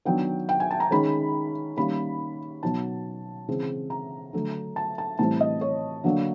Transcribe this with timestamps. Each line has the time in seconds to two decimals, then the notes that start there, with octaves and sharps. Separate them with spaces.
0.05 D#3 F#3 B3 D4 G5
0.49 G5
0.60 G#5
0.71 A5
0.80 A#5
0.91 D#3 G#3 C#4 B5
1.77 D#3 G3 A#3 C#4 B5
2.63 B2 F#3 B3 D#4 A5
3.48 C#3 E3 G#3 C4
3.90 A#5
4.33 D3 F#3 A3
4.76 A5
4.98 A5
5.19 A2 E3 G3 C4 A5
5.41 D#5
5.61 C#5
6.04 D3 F#3 A#3 D4